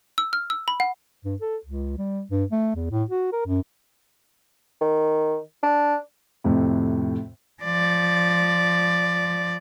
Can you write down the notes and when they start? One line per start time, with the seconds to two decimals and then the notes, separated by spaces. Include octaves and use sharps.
0.18 E6
0.33 F6
0.50 E6
0.68 B5
0.80 F#5
1.25 G2
1.41 A4
1.65 C#2
1.98 G3
2.31 G2
2.52 A3
2.75 E2
2.91 A2
3.10 F#4
3.32 A#4
3.46 F#2
4.81 D#3
5.63 D4
6.44 F2 A2 C3
7.63 F3 D5